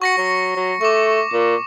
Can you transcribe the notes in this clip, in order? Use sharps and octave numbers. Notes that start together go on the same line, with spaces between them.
F#4 C#6 A#6 C#7
F#3
F#3
A3 C#6 D6
A#2